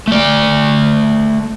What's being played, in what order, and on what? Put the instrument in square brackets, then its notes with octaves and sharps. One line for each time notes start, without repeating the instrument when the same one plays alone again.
[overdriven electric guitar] A3 D5